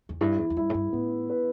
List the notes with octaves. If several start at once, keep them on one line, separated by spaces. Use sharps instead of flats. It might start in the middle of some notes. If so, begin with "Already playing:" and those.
E2
G2 E4
E2
E2
G2 E4
A2
G2
A2 B3
B4